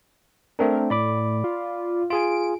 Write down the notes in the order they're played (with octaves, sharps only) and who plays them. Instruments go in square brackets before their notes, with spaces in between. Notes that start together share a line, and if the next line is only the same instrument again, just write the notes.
[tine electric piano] A3 C4 D4 [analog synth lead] A#4
[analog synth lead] A2 [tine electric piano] D5 B5 D6
[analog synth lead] F4
[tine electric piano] F4 G#4 G#5 [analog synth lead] D7